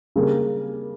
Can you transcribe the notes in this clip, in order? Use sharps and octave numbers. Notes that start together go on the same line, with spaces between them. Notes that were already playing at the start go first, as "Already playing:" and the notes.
C#3 G3 A#3